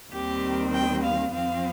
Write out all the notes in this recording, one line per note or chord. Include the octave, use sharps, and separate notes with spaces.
D#2 D#3 G3 C4 G4
G5
F5
F2 F3 C4 F5